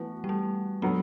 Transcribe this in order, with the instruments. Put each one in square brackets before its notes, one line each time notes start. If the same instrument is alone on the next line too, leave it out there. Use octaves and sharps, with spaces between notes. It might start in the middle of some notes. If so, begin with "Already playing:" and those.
Already playing: [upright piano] E3 B3 F#4 B4 [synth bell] A3
[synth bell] G3
A3
[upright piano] D3 F#3 [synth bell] B3